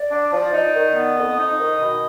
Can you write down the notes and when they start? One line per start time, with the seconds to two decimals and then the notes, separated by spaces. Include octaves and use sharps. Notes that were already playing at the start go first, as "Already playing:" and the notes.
Already playing: D5
0.11 D4
0.33 F3
0.53 D#4
0.75 D#3
0.95 B3
1.17 F2 D#5
1.39 D#4
1.60 D#3
1.81 B2